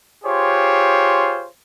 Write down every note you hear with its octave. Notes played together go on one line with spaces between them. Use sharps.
F4 G4 G#4 C5 C#5